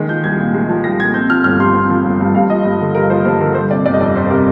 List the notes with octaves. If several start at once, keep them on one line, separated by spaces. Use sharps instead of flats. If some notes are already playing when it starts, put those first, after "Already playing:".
Already playing: D#3 G#3
F3 G6
C2 G#6
A#2
G#3
F3
C2 A#6
A#2 G#6
C4 G6
F3 F6
G1 F6
G2 C6
C4
F3
G1
G2
G2 F5
F3 D#5
G2
D3
G2 A#4
F3 C5
G2 C5
D3 A#4
G3 C5
C3 D5
G1 D5
D#5
F2 D5
G3 C5
C5
C3 A#4